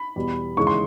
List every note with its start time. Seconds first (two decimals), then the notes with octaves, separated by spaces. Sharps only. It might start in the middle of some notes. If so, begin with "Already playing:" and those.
Already playing: B5
0.16 E2 B2 G3
0.57 D#2 C#3 E3 G#3 C#6
0.67 C6